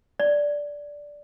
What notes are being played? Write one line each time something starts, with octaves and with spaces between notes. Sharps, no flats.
D5